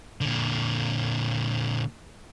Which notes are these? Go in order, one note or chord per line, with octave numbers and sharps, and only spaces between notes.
A#2 D3